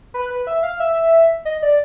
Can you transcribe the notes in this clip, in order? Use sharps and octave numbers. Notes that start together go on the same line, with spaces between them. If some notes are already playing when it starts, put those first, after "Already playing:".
B4
B4
E5
F5
E5
D#5
D5